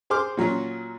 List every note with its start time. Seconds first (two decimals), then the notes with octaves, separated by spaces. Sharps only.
0.10 G#4 C5 C6 D6 F6
0.37 A#2 F#3 C#4 F4